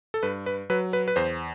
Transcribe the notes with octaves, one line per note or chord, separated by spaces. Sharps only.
A4
G2 B4
B4
F#3 B4
B4
B4
E2 C5